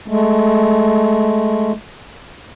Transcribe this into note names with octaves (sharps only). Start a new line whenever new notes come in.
G#3 A3